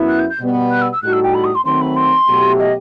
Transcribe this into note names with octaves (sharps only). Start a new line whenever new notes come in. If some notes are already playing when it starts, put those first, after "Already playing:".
Already playing: F#2 F#3 B3 E4
F#6
G6
G6
B2 G3 B3
F#6
E6
E6
A2 G3 D#4 F#4 A4 F#6
E6
G5
B5
D#6
C6
D#3 F#3 A3 C4 C6
B5
C6
B2 F#3 A3 E4 G4
D#5